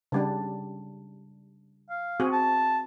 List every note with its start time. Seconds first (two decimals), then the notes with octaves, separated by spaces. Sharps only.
0.12 C#3 G3 D4
1.90 F5
2.20 C4 F#4 G#4
2.32 A5